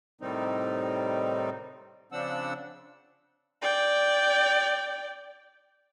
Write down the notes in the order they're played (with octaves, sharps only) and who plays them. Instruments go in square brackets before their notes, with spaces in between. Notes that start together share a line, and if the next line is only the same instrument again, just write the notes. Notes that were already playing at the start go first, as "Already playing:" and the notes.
[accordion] A2 C3 D#3 G3 C4 D#4
C#3 F3 C4 D4 F#5 E6
[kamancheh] D5 G5